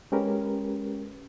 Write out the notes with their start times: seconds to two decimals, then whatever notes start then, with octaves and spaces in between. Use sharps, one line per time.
0.12 G#3 C#4 G4 A#4 B4